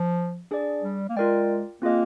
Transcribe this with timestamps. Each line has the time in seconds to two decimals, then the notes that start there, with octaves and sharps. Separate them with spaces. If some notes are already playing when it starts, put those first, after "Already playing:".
Already playing: F3
0.51 D4 G#4 D5
0.83 G3
1.10 A#3
1.16 G#3 F4 A#4 D5 G5
1.82 A#3 C4 F4 G#4 D#5